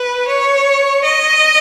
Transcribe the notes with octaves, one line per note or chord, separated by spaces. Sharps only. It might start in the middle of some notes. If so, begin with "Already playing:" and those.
Already playing: B4
C#5
D#5